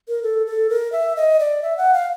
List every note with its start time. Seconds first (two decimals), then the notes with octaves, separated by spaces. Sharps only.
0.08 A#4
0.23 A4
0.47 A4
0.70 A#4
0.92 E5
1.16 D#5
1.40 D5
1.63 E5
1.77 F#5
1.94 F5